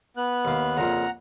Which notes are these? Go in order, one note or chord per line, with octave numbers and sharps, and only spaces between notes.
B3 F#6
D#2 F5
F2 A#2 C#3 F#5 A#5